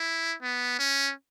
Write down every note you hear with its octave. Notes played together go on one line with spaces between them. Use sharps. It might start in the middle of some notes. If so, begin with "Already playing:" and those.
Already playing: E4
B3
C#4